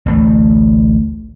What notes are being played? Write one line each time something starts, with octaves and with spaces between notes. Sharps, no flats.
A1 D2 A3